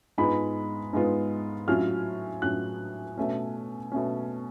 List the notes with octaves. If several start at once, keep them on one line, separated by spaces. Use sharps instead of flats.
G#2 G#3 B3 F4 B5
G#2 G#3 B3 F4
A2 F#3 C#4 F4 F6
A2 F#3 C#4 F4 F#6
B2 A3 C#4
B2 A3 C#4